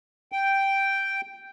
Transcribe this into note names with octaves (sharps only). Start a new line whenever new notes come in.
G5